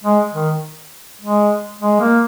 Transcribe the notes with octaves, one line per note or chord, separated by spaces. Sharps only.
G#3
D#3
G#3
G#3
A#3